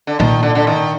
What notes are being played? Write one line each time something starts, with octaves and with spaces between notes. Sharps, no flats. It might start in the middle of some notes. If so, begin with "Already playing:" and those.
D3
A#2 D#3
D3
D3
D#3